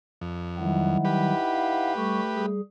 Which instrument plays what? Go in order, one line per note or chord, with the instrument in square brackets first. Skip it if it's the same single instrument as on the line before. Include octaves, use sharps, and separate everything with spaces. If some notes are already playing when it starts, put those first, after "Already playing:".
[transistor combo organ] F2
[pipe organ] D#3 F#3 G3 [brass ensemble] D#4 E4 F#5
[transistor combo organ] G4 B4
[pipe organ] F5
[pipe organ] G3 C#6 [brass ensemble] A3
[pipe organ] G3 G#4